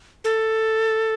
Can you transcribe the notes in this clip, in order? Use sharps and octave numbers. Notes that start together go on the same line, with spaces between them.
A4